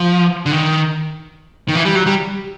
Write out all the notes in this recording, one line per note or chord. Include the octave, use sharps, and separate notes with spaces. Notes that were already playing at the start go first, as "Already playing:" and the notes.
Already playing: F3
D3
D#3
D#3
E3
G3
F#3
G3